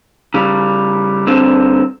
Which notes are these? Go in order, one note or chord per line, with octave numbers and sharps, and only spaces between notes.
C#3 G3
G2 D3 C4